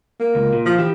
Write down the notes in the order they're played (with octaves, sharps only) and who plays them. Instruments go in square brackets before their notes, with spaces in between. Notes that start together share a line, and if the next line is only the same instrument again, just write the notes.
[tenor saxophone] A#3
[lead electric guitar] C#2
A#2
[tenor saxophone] F3
[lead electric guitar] E3 [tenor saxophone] G4